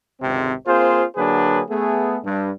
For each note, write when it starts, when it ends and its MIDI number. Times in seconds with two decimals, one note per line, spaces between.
0.21 0.53 32
0.21 0.53 37
0.21 0.53 48
0.21 0.53 60
0.66 1.04 58
0.66 1.04 60
0.66 1.04 65
0.66 1.04 68
0.66 1.04 72
1.16 1.61 50
1.16 1.61 54
1.16 1.61 58
1.16 1.61 62
1.16 1.61 68
1.16 1.61 71
1.69 2.17 57
1.69 2.17 59
1.69 2.17 68
2.24 2.50 43